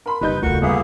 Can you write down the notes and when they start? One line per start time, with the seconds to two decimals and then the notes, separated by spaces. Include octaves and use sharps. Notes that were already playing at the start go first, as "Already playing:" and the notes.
0.06 A#4 B5 C6
0.21 F#1 G3 D#4 B4 G6
0.43 D#2 C#3 A3 F4 F#4 A#4 C#6
0.62 C2 A#3 B3 G#4 E5